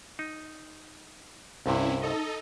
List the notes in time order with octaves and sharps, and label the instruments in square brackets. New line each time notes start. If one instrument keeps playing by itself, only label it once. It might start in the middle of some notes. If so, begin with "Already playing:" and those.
[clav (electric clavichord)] D#4
[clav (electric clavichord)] C2 G2 C3 [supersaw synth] C4 C#4 E4
[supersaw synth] D#4 A4 D#5